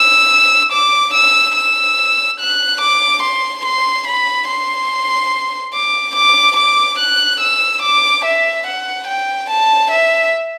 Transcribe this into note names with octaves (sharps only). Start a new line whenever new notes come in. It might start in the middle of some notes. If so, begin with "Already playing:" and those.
Already playing: E6
D6
E6
E6
F#6
D6
C6
C6
B5
C6
D6
D6
D6
F#6
E6
D6
E5
F#5
G5
A5
E5